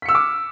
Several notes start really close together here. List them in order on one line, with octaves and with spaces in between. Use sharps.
B6 C#7 E6 F6 D6